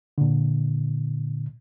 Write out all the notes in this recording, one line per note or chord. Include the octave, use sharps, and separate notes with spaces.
A#2 D3